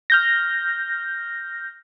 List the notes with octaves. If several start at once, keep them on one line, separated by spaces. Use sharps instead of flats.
F6 G6 A#6